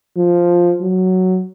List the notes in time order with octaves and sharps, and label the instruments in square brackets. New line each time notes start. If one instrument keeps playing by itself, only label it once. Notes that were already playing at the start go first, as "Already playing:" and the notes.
[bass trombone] F3
F#3